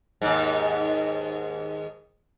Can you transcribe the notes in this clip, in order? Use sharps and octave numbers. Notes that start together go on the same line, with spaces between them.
D#2 G#2